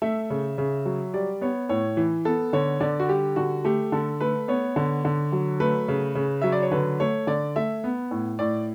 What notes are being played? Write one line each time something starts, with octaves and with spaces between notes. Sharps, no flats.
A3 E5
C#3
C#3
F#3
G3 D5
B3 C#5
A2 C#5
E3
B3 A4
D3 C#5
D3 D5
F#4
G3 G4
D3 F#4
A3 G4
D3 A4
A3 B4
B3 C#5
D3
D3
F#3
A3 B4
C#3
C#3
F#3 E5
D5
C#5
D3 B4
A3 C#5
D3 D5
A3 E5
B3
A2
A2 D5